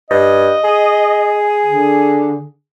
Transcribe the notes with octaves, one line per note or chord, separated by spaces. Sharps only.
G2 D#5
G#4
D3